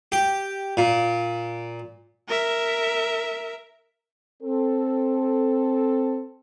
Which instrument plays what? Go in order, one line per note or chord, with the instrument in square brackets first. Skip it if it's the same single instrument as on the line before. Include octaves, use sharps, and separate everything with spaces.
[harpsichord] G4
A#2
[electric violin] A#4 E5
[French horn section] C4 A4